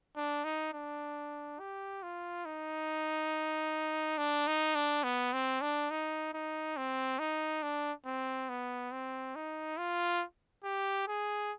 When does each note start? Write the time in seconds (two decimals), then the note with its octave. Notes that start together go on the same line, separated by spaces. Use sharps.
0.16 D4
0.44 D#4
0.73 D4
1.60 G4
2.03 F4
2.45 D#4
4.18 D4
4.47 D#4
4.75 D4
5.04 B3
5.33 C4
5.62 D4
5.91 D#4
6.34 D#4
6.77 C4
7.19 D#4
7.62 D4
8.06 C4
8.49 B3
8.92 C4
9.35 D#4
9.78 F4
10.64 G4
11.08 G#4